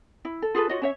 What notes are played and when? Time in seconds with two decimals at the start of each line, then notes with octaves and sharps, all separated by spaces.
0.25 E4
0.42 A4
0.55 F4 G#4 A4 B4
0.69 F4 F#4 C#5 D#5
0.82 C#4 C#5 E5